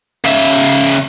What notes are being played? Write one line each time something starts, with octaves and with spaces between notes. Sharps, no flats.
C#3 E5